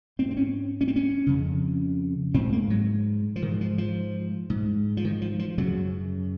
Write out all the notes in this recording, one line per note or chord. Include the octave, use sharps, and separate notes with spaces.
G#2 C4
C4
C#4
C#4
C4
C#4
F2 C#3
G#2 C4
A#3
F#3
F3
G#2 D#3
F3
F3
G#2
F3
D#3
F3
F3
F#2 C#3 F#3